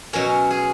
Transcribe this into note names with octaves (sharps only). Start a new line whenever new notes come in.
B2 F#3 C#4 A#4
G#4